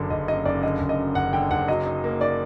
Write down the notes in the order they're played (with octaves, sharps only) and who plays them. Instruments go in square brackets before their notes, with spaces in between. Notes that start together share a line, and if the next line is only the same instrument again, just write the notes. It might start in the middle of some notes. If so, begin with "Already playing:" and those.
Already playing: [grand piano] F#1 F#2 D3
[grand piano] F#1 [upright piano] D#5
[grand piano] F#2 [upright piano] D#5
[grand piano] F#1 [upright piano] D5
[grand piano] D3 [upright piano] D#5
[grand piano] F#1
[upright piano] D#5
[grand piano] F#2
[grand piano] F#1 [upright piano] F#5
[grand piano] D3 [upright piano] G5
[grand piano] F#1 [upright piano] F#5
[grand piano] F#3 [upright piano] D#5
[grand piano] D#4
A#3
[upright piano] D5